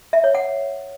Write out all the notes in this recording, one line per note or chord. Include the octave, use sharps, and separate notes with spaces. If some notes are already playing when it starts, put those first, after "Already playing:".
E5
C#5
F#5